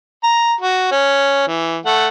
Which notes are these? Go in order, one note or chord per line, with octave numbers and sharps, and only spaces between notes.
A#5
F#4
C#4
E3
A3 F#5